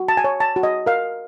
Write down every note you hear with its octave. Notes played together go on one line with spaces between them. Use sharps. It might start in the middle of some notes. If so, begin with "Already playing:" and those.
Already playing: F#4
A5
G#5
C#5
A5
F#4
D#5
A#4 F5